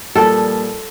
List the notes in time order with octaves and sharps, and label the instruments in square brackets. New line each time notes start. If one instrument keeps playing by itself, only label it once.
[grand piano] A#2 F3 G3 [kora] A4